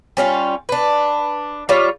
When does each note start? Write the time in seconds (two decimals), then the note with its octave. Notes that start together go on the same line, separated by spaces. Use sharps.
0.17 G3 C#4 D#4 F4
0.69 D4 B4
1.69 G3 F4 C#5